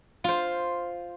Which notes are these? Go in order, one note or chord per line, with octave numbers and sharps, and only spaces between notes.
F4 C5